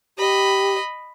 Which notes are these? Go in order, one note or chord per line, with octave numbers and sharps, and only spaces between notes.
G4 D#5 B5